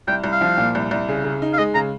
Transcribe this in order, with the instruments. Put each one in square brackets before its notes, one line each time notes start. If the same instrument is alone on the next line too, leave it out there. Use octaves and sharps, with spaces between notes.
[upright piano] C2 [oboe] G5
[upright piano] C2
[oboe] F5
[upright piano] F3
A#2
C2
C2
C#3
C#3
D#4
[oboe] F5
[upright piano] G#3 [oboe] D#5
[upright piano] C#3 [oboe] A#5